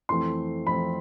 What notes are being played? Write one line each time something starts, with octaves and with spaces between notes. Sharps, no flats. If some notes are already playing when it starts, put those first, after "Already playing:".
F2 E3 A3 C4 C6
F2 E3 A3 C4 B5